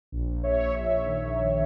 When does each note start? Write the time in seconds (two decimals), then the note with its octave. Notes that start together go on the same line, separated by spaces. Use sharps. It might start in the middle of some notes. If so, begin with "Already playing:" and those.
0.12 A#1
0.44 C#5 E5
0.60 A#1
0.75 C#5 E5
1.06 D#3